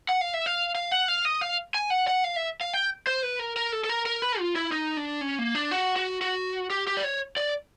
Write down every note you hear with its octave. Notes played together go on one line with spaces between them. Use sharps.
F#5
F5
E5
F5
F5
F#5
F5
D#5
F5
G#5
F#5
F#5
F5
E5
F5
G5
C5
B4
A#4
A#4
A4
A4
A#4
A#4
B4
F4
E4
D#4
D4
C#4
A#3
D4
F#4
F#4
F#4
G4
G4
D5
C#5
D5